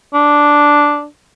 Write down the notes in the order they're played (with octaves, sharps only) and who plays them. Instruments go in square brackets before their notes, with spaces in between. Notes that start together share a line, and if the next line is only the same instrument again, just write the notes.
[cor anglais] D4